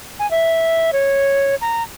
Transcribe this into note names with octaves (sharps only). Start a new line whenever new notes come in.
G#5
E5
C#5
A#5